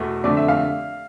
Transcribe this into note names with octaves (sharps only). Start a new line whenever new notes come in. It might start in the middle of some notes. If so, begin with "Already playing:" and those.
Already playing: E2 B2 A3 E5
F2 D3 A3 D5
E5
F5